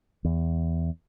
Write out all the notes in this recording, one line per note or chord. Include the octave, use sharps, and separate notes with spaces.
E2